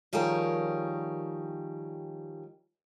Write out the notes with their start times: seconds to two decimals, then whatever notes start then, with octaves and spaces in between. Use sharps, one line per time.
0.13 D#3 F3 G3 G#4 A#4 C#5